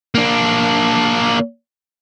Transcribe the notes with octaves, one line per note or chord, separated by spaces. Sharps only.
A#3 D4